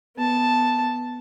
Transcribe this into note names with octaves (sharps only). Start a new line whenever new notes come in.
B3 A5